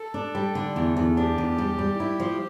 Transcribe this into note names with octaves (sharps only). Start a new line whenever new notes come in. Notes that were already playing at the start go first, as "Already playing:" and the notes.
Already playing: A4
D4
G3
D3
E2
E2
D4 G4
E2
G3
G3
E4
F3